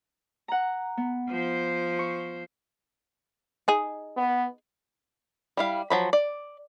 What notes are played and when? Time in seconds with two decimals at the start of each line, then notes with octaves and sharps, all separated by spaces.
0.48 F#5 A#5
0.97 B3
1.29 F3 C5
1.99 C#6
3.68 D#4 G#4
4.17 B3
5.57 G3 E4 F5
5.90 F3 F#3 B5
6.13 D5